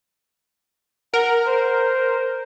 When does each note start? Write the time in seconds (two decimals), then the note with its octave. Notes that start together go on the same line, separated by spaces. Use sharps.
1.14 A#4 F#5
1.47 C5